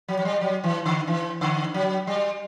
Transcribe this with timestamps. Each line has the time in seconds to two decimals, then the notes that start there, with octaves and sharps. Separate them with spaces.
0.08 F#3
0.19 F#3
0.25 G3
0.41 F#3
0.64 E3
0.86 D3
1.07 E3
1.41 D3
1.74 F#3
2.07 G3